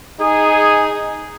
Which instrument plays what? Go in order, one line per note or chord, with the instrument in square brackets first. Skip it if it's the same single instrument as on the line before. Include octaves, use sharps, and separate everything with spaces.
[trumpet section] D#4 G#4